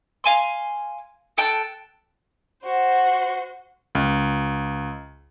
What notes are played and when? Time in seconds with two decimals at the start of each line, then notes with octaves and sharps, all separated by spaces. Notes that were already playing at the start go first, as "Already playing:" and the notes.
0.24 F5 G#5 C6
1.38 A4 G5 A5 F#6
2.63 F#4 C5
3.95 C#2